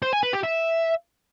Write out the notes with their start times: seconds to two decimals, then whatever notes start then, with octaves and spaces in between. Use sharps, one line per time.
0.02 C5
0.13 G#5
0.23 B4
0.33 G4
0.43 E5